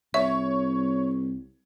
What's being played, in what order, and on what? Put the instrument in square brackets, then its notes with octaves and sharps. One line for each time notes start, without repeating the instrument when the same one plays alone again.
[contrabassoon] C2 [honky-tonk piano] C#5 [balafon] E5